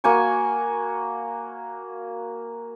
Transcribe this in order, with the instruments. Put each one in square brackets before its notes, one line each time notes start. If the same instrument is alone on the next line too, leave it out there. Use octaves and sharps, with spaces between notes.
[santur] A#3 F#4 G#5 C#6